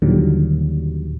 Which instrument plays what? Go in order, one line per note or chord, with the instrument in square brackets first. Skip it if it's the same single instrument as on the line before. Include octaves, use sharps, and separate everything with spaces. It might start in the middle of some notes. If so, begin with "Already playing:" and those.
[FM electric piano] D#2 A#2 D3 D#3 F#3 G3